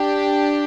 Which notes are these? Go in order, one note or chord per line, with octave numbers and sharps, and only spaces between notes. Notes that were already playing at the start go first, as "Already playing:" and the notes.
Already playing: D4 G4